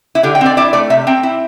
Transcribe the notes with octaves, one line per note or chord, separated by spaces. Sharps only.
E4
D3 G4
G5
C4 D5
E4 D5
A3 D5
C3 E5
C4 G5
E4